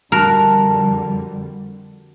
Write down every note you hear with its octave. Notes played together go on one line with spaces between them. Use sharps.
F2 D3 G3 F#4 A#4 A5 F#6